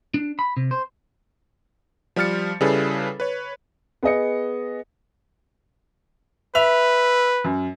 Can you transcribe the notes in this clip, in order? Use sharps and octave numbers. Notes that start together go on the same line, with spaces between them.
D4
B5
C3
C5
F3 G3 C5 F6 A6 C#7
C#3 G3 E4 G#4 A4 B4
B4 C#5
B3 G#4 D#5 C#7
B4 E5 F7
F#2